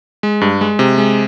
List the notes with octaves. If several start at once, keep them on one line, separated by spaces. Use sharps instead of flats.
G#3
G2
G#3
C3
G#3